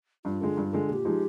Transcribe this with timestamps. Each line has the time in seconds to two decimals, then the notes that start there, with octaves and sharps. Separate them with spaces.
0.25 G2 F4
0.41 D3 G#3
0.57 G2
0.73 D3 G#3
0.89 A#2 G4 A4
1.05 F3 G#3 D#4